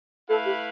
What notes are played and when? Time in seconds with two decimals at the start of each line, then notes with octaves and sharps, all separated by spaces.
0.29 A3 E4 A4 B4 F5
0.45 G4